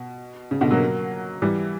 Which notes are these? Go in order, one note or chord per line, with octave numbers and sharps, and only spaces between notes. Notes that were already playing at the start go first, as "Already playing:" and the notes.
Already playing: B2
C#3
B2 D3
F#3 A#3
E3 G3